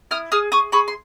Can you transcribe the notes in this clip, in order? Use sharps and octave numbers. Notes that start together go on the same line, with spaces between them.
E4 D#6 F6
G#4 D#6 F6
G#4 C#6 D#6
G#4 B5 C#6
C6